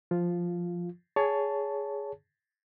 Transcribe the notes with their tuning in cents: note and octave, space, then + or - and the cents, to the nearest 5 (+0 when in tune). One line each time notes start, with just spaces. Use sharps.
F3 +0 F4 +0
G#4 +0 C#5 +20 A5 +0